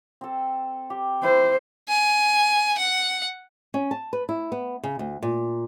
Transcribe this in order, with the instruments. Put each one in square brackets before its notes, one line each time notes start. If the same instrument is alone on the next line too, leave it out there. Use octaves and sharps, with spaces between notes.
[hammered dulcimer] C4 A4
G4
[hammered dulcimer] E4 [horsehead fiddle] C5
[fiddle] G#5
F#5
[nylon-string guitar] C#4
A5
B4
E4
B3
C#3
D2
A#2